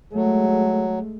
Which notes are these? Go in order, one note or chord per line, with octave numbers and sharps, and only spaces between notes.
F#3 G#3 A3